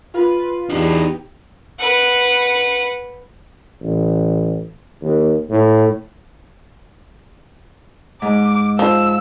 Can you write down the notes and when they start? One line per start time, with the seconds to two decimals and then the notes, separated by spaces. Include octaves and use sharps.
0.14 F4 B4
0.70 E2 D#4 G4 D5
1.79 B4 F#5
3.82 A1
5.02 D#2
5.50 A2
8.22 G#2 D6
8.79 F3 E6